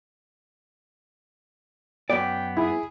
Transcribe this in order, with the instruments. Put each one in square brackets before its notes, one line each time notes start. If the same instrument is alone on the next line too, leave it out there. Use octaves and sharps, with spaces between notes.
[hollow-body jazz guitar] F#2 B3 D5 [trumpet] G5
[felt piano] E4 [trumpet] G#4